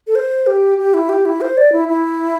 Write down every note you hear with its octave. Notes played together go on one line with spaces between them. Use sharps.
A4
C5
G4
G4
E4
G4
E4
C5
D5
E4
E4